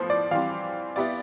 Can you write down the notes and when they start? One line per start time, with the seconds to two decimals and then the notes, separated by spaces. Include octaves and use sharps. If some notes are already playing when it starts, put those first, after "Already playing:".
Already playing: A2 F3 B3 C5
0.10 D5
0.31 E3 G3 C4 F5
0.96 B3 E4 G4 D5